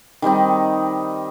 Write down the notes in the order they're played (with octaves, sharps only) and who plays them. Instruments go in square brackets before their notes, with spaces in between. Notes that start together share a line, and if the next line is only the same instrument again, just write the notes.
[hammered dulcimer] D#3 G3 C4 D#4